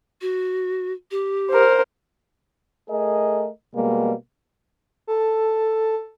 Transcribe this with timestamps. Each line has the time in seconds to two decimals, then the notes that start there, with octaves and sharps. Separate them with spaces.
0.21 F#4
1.11 G4
1.51 A#4 C5
2.89 A3 G#4 A#4 D#5
3.74 B2 G3 G#3 A#3
5.07 A4